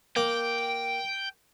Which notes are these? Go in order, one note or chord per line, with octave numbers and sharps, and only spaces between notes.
A#3 G5